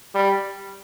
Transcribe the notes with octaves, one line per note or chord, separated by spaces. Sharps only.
G3